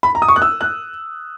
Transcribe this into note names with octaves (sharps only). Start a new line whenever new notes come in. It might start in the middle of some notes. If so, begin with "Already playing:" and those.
B5
A#5
D#6
C#6
F#6
E6
F#6